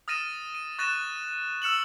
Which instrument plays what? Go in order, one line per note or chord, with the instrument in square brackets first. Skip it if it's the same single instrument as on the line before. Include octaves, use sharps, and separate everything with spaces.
[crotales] D#6 F6 A6 A#6 D#7 E7
D#7
C#6 F#6 A6 A#6 D#7 E7
E6 F6 C#7 E7 F#7